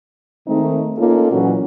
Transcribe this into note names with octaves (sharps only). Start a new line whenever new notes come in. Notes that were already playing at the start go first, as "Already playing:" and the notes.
D#3 G#3 A3 C4 D#4
A#3 C#4 D#4 F4 A4
A#2 E3 F#3 C#4 F#4